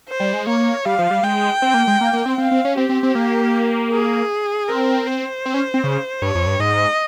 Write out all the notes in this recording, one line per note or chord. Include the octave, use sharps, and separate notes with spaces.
C5
G3
G#3
A#3 C#5
G3 F5
F3
G3
G#3 G5
C4
A#3
G#3
A#3
A#3
C4
C4 F5
C4
C#4
C4 G4
C4
C4
A#3
G#4
C4 A#4
C5
C4
C#4
C4
C#3
G2 C#5
F2
G2
G#2 D#5